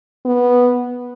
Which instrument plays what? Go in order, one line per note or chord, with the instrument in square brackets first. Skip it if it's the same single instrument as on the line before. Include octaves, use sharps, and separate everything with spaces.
[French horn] B3